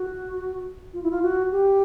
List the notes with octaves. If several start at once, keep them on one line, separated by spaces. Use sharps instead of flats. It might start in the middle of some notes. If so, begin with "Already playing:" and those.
Already playing: F#4
F4
E4
F4
F#4
G4